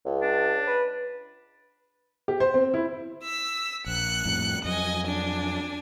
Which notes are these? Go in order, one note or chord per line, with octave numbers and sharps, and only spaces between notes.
C#2
D4
B4
G4
C5
C4
E4
E6 B6
A#1 F#6 C#7
F2 A2
F2 F#3 D#5 G#5
D4 G#5